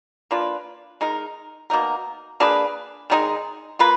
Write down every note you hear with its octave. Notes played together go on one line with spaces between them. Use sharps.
A#3 D4 F4 B4
G#3 D#4 A#4
B2 A#3 D#4 A#4
A#3 D4 G#4 B4
D#3 G#3 D#4 G#4
A#3 F4 B4